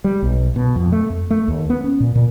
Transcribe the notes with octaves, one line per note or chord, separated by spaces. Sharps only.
G3
B1
B2
F2
A3
F2
A3
D#2
B3
C#4
A#2
A#2